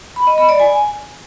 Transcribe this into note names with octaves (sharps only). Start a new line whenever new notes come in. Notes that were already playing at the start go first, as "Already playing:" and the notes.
B5
D#5
B5
D5
G#5